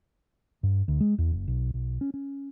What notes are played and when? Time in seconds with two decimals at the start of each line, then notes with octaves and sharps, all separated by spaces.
0.63 G2
0.88 D2
1.00 G#3
1.18 E2
1.32 F#1
1.48 B1
1.74 B1
2.01 C#4
2.14 C#4